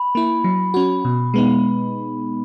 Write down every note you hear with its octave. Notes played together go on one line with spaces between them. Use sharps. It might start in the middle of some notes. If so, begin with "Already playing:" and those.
Already playing: B5
A#3 E4
F#3
C#4 F#4
B2
G#3 B3 D#4